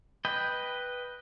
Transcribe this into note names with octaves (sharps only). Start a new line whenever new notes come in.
B4 D#5 G5